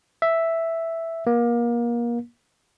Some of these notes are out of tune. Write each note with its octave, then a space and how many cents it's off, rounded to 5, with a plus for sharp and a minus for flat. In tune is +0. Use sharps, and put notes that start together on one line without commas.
E5 +0
A#3 +30